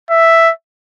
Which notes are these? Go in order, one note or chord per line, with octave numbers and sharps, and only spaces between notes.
E5